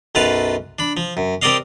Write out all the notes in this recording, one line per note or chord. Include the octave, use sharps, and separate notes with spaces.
B1 F#2 F4 B4 F5 A5
D4 B5
F3
F#2
C4 G4 A#4 D5 D#5 F5